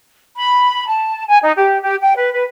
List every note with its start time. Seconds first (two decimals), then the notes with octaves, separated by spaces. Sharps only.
0.37 B5
0.88 A5
1.28 G#5
1.42 D#4
1.57 G4
1.83 G4
2.01 G5
2.17 B4
2.33 B4